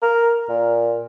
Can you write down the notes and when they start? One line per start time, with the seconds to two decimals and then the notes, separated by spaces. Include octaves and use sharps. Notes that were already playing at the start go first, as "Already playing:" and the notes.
0.02 A#4
0.49 A#2